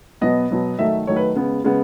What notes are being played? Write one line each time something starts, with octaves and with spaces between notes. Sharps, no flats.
B2 F#3 B3 D#5
B2 F#3 B3
D#3 F#3 A3 E5
D#3 F#3 A3 C#5
B4
C#3 G#3 B3
C#3 G#3 B3